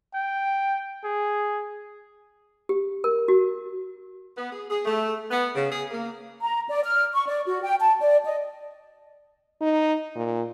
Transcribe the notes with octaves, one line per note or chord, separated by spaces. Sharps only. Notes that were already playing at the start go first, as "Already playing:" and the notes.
G5
G#4
G4
A#4
F#4
B3
G#4
G#4
A3
B3
C#3
G#4
A#3
A#5
D5
F6
C#6
D5
F#4
G5
A5
D5
D#5
D#4
A#2